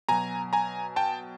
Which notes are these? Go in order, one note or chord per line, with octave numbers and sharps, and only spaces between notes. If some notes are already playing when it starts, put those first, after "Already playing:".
B2 F#3 G#5 A#5
G#5 A#5
G5 A5